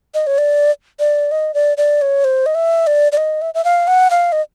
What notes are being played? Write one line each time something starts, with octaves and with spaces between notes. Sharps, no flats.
D#5
C#5
D5
D5
D#5
D5
D5
C#5
C5
D#5
E5
D5
D5
D#5
E5
E5
F5
F#5
F5
D#5